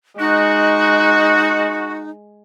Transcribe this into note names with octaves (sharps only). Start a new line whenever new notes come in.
G#3 D#4 F#4 F#6